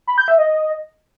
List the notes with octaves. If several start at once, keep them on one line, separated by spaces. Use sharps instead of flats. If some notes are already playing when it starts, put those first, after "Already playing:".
B5
G6
E5
D#5